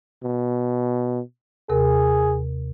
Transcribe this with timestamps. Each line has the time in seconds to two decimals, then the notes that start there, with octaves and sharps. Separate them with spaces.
0.24 B2
1.69 D#2 C3 G#4 A#4